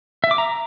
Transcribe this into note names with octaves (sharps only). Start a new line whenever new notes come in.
E5
D6
A#5